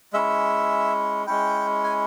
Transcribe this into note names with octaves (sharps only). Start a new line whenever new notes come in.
G#3 C#4 E4 E5
G#3 C#4 E4 G5
G#5